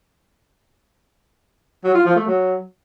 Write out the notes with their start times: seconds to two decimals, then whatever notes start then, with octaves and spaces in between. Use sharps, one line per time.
1.84 F#3
1.95 F4
2.05 F3
2.16 A3
2.27 F#3